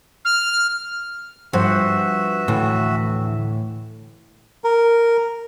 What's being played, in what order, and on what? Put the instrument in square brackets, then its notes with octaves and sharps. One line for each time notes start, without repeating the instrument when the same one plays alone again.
[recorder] F6
[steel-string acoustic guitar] G2 [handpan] F3 C5 F#5 [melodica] F#4 E5
[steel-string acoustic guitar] D2 [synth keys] A2 E3
[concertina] A#4